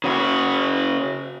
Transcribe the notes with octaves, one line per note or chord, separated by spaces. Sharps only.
C#3 F#4